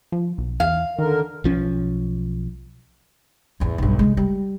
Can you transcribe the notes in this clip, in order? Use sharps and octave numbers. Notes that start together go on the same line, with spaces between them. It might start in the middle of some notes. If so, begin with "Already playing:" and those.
F3
B1
E2 F5
D3 D#3 A#4
B1 F3 C#4
A1 E2
B1 G2
C3 G#3
G3